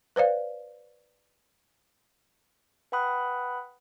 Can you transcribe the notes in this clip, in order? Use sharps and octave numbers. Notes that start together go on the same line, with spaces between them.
B4 C5 D5 F5
B4 F#5 G5 B5 D#6 F#6